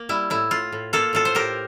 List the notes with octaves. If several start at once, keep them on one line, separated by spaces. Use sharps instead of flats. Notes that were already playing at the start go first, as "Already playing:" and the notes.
Already playing: A#3
G3 E4
A2 E4
A2 F4
A2
A#3 F4 A4
A2 F4 A4
C5
A2 G4 A#4